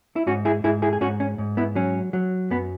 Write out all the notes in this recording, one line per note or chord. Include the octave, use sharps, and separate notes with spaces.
E4
G#2 C#4 F#4
E4 G#4
G#2 E4 G#4
E4 G#4
G#4
G#2 C#4 F#4
C#4
G#2
B3 E4
F#3 C#4
F#3
F#2 B3